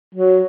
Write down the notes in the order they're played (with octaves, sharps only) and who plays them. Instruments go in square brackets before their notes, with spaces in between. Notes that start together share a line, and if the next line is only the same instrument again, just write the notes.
[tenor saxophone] F#3